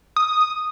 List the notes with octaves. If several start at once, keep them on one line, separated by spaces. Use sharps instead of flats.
D#6